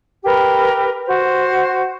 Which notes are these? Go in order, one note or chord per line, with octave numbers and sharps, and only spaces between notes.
G4 A#4 B4
F#4 C5